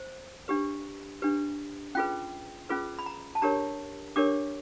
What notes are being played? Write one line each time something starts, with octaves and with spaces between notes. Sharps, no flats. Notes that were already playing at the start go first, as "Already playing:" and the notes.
Already playing: C5
D4 G4 B4
D4 G4 B4
C#4 F4 G#4 B4 G5
C#4 F4 G#4 B4
B5
A#5
A5
D4 G4 A#4 C#5 A#5
D4 G4 A#4 C#5 D6